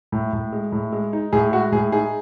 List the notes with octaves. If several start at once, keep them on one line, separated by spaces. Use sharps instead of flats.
A2
A2
G#3
A2
G#3
D#4
A2 G#4
G#3 F#4
A2 G#4
D#4 G#4